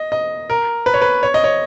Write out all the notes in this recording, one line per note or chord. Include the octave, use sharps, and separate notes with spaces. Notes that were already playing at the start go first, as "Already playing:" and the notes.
Already playing: D#5
D#5
A#4
B4
C#5
B4
C#5
D#5
C#5